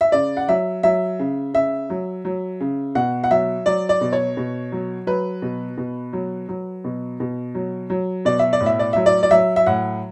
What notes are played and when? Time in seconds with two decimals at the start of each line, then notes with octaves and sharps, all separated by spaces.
0.01 E5
0.12 C#3 D5
0.37 F#5
0.48 F#3 E5
0.83 F#3 E5
1.19 C#3
1.54 C#3 E5
1.90 F#3
2.25 F#3
2.60 C#3
2.95 B2 F#5
3.24 F#5
3.31 F#3 E5
3.66 F#3 D5
3.89 D5
4.01 B2
4.13 C#5
4.37 B2
4.72 F#3
5.07 F#3 B4
5.42 B2
5.77 B2
6.13 F#3
6.49 F#3
6.84 B2
7.20 B2
7.55 F#3
7.90 F#3
8.25 B2 D5
8.39 E5
8.53 D5
8.61 A2
8.66 E5
8.79 D5
8.93 F#3 E5
9.06 D5
9.23 D5
9.31 F#3 E5
9.56 E5
9.66 A2 F#5